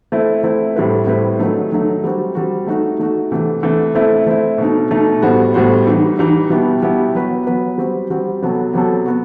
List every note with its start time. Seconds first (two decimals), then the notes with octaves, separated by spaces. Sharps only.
0.12 A3 C4 E4
0.44 A3 C4 E4
0.76 A2 G3 C4 E4 B4
1.07 A2 G3 C4 E4 B4
1.39 D#3 F#3 A3 D#4
1.72 D#3 F#3 A3 D#4
2.04 G3 C4 F#4
2.35 G3 C4 F#4
2.67 A3 D#4 F#4
3.00 A3 D#4 F#4
3.31 C3 E3 A3
3.63 C3 E3 A3
3.95 A3 C4 E4
4.27 A3 C4 E4
4.58 B2 A3 D#4
4.91 B2 A3 D#4
5.22 A2 G3 B3 F#4 C5
5.54 A2 G3 B3 F#4 C5
5.87 E3 G3 D#4
6.19 E3 G3 D#4
6.50 B2 G3 B3 E4 G4
6.82 B2 G3 B3 E4 G4
7.14 F#3 B3 F#4 B4
7.47 F#3 B3 F#4 B4
7.78 G3 C4 F#4
8.10 G3 C4 F#4
8.42 C3 F#3 B3 F#4 A4
8.73 C3 F#3 B3 F#4 A4
9.06 B3 F#4